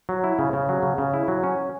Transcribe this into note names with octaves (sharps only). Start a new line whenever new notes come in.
F#3
E4
C#3
C#3
F#3
C#3
C#3
E4
F#3
C#4